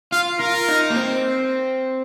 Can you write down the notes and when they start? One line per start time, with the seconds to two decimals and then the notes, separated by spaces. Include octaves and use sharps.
0.12 F4 F5
0.40 F4 A#4
0.68 D#4
0.90 A#3
0.96 C4